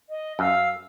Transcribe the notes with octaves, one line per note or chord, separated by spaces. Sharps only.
D#5
F#2 F5 E6